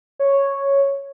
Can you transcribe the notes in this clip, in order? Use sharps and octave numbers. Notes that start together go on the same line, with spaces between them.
C#5